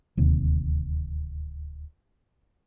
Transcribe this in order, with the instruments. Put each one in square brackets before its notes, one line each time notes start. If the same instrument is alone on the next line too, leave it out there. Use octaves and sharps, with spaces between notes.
[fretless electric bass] D1 D#2 C3